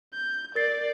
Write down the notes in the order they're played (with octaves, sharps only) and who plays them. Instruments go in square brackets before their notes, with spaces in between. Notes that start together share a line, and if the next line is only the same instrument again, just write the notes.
[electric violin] G6
[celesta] A#4 A6 C7 [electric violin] D5